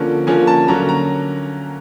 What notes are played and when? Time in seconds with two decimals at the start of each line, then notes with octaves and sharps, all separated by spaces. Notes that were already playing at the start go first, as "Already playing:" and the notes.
Already playing: D3 F3 A#3 C#4
0.27 D3 F3 A#3 C#4 G#5
0.47 A5
0.68 D3 F#3 A#3 C#4 A#5
0.89 A#5